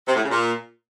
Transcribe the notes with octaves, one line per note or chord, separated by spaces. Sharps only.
C3
A2
C#3
A#2